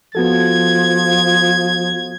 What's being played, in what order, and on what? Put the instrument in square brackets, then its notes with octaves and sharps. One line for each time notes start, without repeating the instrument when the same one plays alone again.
[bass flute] F3 [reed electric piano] B3 F#4 A4 [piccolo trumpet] G#6